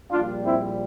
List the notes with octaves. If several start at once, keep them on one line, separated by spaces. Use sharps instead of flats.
A#1 A#2 G3 D4 F4
C4 E4